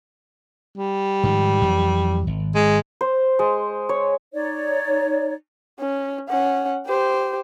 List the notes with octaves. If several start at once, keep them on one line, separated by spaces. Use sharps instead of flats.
G3
G#2 D#3 F3
F2 E3 F#3
G#1
G#3
C5
G#3
C#5
D#4 C#5 D5
C#4
C#4 F#5
G4 C5